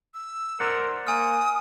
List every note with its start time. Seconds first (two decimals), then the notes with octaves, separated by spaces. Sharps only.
0.14 E6
0.60 A#4 C5 D5 F#5
1.07 A#3 G#5 D#6 F6